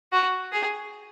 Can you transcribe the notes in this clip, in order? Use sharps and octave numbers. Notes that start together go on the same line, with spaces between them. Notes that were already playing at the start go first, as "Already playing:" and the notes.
F#4
G#4